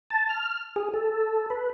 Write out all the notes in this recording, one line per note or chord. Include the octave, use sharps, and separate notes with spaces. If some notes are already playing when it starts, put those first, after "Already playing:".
A5
F6
G#4
A4
B4